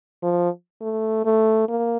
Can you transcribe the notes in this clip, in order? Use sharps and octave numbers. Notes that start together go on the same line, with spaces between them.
F3
A3
A3
A#3